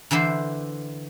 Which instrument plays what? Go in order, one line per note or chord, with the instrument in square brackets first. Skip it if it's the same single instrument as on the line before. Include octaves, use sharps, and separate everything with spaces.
[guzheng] D3 E3 E4 C5